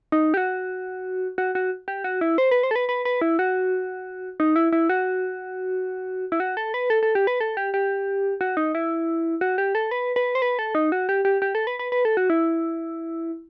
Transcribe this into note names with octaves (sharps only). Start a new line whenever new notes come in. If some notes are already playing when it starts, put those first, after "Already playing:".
D#4
G4
F#4
F#4
F#4
G4
F#4
E4
C5
B4
C5
A4
B4
B4
B4
E4
F#4
D#4
E4
E4
F#4
E4
F#4
A4
B4
A4
A4
G4
B4
A4
G4
G4
F#4
D#4
E4
F#4
G4
A4
B4
B4
C5
B4
A4
D#4
F#4
G4
G4
G4
A4
B4
B4
B4
A4
F#4
E4